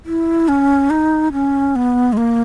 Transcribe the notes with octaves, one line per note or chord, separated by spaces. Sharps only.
E4
C#4
D#4
C#4
B3
G#3
A#3